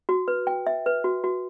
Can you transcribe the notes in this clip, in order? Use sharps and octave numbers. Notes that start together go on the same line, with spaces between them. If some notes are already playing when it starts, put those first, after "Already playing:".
F#4
B4
G5
E5
B4
F#4
F#4